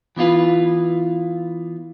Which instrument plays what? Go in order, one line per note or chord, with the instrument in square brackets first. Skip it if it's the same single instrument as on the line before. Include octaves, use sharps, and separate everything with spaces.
[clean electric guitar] E3 B3 E4 F4 B4